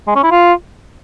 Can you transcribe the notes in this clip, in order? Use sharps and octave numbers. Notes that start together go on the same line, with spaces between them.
G#3
C#4
E4
F4